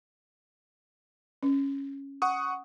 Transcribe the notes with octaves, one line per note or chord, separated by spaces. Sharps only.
C#4
F#5 C#6 D#6